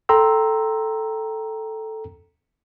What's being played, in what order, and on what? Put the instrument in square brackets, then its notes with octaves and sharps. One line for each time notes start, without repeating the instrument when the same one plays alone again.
[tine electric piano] A4 G5 A#5 C6 E6